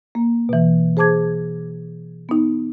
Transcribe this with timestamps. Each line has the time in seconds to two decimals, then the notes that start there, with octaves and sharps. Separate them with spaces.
0.15 A#3
0.49 B2 E3
0.97 G#4 C5 A5 D6 G#6
2.29 B3 D#4